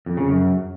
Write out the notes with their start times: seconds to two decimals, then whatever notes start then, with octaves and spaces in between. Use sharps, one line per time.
0.06 F2
0.17 C#3
0.28 F#2